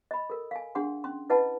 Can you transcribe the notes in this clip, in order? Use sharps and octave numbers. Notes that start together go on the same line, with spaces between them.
D#5 B5
A4 A#4
F5 G#5
D4 G#4 F#5 C6
C#4 C6
E4 B4 D#5 F#5 A5 B5